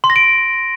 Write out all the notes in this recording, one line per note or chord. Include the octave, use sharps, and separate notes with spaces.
C6
A#6
D7